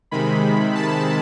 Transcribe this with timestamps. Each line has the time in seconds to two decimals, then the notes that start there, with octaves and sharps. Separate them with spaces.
0.11 C3 D#3 G#3 B5
0.75 A5